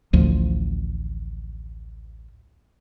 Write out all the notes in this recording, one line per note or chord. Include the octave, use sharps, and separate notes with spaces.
A1 D2 F3